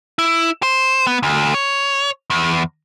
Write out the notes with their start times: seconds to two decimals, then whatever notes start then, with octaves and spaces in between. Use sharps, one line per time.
0.19 E4
0.63 C5
1.07 B3
1.23 D2
1.54 C#5
2.30 E2